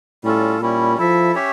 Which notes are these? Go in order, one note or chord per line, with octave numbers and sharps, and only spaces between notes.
A2 G3 C#4 F4 A4
A#2 G3 C#4 E4
F3 E4 A4 E5
C#4 G4 C#5 E5